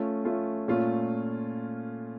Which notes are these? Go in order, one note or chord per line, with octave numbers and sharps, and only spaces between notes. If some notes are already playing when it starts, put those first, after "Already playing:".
Already playing: A3 C#4 F4
A3 C#4 F4
A#2 A3 C#4 F4